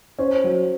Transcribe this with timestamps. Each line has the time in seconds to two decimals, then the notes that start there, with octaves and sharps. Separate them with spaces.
0.19 C#4 C5
0.44 F#3